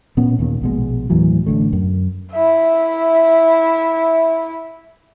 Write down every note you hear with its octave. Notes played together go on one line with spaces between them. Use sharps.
A#2 B3 C#4
D#2 A#2 D#3
A#1 B2 G#3
D#2 A2 E3 F#3
A1 D3 A3
F#2
E4 E5